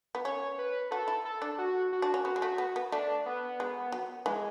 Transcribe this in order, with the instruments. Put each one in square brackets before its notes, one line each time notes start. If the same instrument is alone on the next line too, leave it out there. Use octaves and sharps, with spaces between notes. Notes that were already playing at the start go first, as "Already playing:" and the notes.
[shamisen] B3
[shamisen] C#4 [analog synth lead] C#5
[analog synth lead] B4
[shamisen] F#4 [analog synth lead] A4
[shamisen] E4
[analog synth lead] A4
[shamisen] D4
[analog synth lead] F#4
F#4
[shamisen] D4
C#4
[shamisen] B3 [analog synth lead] F#4
[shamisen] G#3
A3
B3
B3
[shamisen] A3 [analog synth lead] D4
[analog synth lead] B3
[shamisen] G#3
F#3
[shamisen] E3 [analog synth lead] G#3